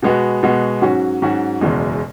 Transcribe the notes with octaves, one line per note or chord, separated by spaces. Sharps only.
B2 G#3 B3 F#4
B2 G#3 B3 F#4
G#2 F#3 C#4 F#4
G#2 F#3 C#4 F#4
F#1 E2 B2 G#3